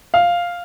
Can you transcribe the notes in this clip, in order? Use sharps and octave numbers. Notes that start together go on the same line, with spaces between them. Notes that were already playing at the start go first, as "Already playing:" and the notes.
F5